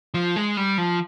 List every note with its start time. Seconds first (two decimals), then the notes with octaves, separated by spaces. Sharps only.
0.14 F3
0.36 G#3
0.57 G3
0.78 F3